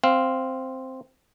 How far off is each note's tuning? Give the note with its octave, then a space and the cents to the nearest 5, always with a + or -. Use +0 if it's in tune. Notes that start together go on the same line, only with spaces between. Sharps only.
C4 +0 F5 +0